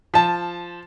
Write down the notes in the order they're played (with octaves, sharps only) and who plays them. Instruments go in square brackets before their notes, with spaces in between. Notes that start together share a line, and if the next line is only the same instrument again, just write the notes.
[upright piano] F3 A5